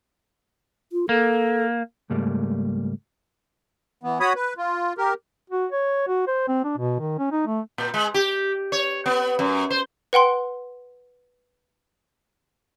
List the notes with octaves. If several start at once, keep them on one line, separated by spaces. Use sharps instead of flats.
F4
A#3 A4
C#2 G#2 G3 A3 A#3
E3 B3
F#4 C#5 B5 D#6
B4
F4
G4 A#4
F#4
C#5
F#4
C5
C4
D4
B2
D#3
C#4
D#4
A3
A#2
G#3
G4
C#5
B3
F#2
C5
B4 F#5 G5 C6